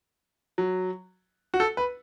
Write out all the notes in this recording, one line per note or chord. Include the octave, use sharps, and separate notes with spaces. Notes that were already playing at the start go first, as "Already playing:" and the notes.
F#3
F#4
A4
B4